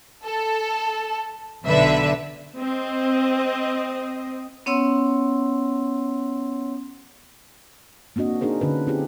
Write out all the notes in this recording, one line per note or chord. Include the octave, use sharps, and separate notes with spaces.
A4
B1 D3 B4 E5
C4 D#5
B3 C#4 C#5 F#5 C6 E6
A#3 C4 D4 F#4 D#5
D4 D#4 G#4 A#4 C5
D3 C#4 B4
C4 D#4 F4 G4 G#4